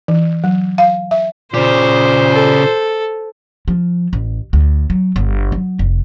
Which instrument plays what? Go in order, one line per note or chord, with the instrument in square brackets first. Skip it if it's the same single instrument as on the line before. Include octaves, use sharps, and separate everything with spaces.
[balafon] E3
F#3
F5
E5
[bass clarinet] A#2 [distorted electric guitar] C#3 G4 [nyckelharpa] C5
[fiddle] A4
[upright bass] F3
A1
D2
F#3
G1
F#3
F1